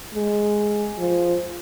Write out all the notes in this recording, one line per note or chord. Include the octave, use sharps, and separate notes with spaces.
G#3
F3